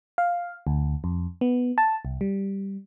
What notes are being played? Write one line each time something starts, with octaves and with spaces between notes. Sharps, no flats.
F5
D2
F2
B3
A5
C2
G3